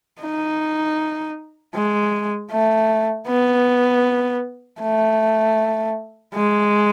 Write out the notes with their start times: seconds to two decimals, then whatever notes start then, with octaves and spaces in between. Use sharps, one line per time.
0.22 D#4
1.75 G#3
2.51 A3
3.28 B3
4.81 A3
6.35 G#3